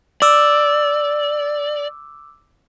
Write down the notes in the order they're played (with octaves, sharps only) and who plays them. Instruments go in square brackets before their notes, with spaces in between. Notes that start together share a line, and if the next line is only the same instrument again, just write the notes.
[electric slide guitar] D5 [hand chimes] D6 E6